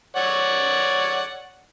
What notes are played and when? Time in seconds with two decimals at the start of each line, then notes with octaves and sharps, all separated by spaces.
0.16 C#5 D5 F#5